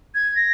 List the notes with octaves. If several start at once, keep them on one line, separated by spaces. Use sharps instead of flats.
G#6
A#6